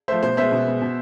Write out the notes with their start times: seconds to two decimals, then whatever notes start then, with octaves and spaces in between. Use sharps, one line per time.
0.08 F3 A3 C5 E5
0.23 B2 C5
0.37 G#3 B3 C5 E5
0.52 B2
0.66 G#3 B3
0.82 B2